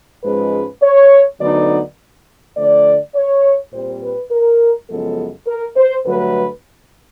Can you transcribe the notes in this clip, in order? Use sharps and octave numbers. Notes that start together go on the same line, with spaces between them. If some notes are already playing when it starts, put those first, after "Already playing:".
G#2 F3 G#3 C#4 B4
C#5
D2 D3 F#3 B3 D#4 D5
D3 F3 A3 D5
C#5
A#2 G3 C4 C5
B4
A#4
F#2 C#3 F3 G#3 B3 A4
A#4
C5
G2 D3 F#3 A3 B4